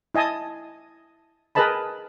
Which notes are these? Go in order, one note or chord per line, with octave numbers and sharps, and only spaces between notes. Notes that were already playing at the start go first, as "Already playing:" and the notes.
E4 D#5 G#5 A5 D#6
G#4 A#4 B4 D#5 A5 B5